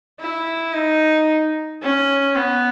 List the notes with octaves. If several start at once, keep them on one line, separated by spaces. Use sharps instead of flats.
E4
D#4
C#4
B3